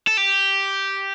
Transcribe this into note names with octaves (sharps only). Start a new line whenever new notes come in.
A4
G4